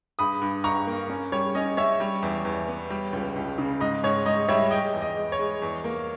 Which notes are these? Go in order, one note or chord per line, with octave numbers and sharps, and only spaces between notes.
G2 B5 D#6
G2
G2 A#5 C#6
A#3
C#4
G3 C#5
C#4 D#5
C#4 C#5 E5
G3
E2
E2
B3
G3
C#2
C#2
C#3
G#2 D#5
G#2 C#5
G#2 D#5
G3 C#5 E5
G#3 D#5 G5
E2
D#5
G#3
C#5
G#3
E2
A#3